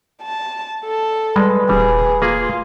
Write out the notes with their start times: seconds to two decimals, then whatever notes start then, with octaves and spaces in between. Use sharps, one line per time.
0.23 A5
0.85 A4
1.36 G3 G#3 B4
1.69 D#1 G3 G#4
2.22 A#3 F4 G#4